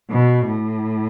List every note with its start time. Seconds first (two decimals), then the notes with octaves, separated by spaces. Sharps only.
0.10 B2
0.46 A2